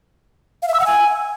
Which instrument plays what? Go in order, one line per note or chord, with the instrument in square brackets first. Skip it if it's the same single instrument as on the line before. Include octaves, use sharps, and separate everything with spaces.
[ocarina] F5
E5
E6
F#5
G#5